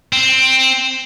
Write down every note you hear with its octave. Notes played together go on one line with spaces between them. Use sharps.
C4